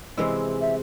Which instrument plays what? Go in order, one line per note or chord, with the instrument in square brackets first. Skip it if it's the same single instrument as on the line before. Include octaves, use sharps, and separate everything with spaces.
[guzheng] C3 E3 G#3 E4
[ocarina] E5